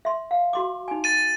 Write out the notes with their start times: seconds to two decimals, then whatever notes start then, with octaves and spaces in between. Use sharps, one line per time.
0.05 E5 C6
0.31 F5
0.53 F#4 C6 D6
0.88 D#4 G#5
1.04 A6 D#7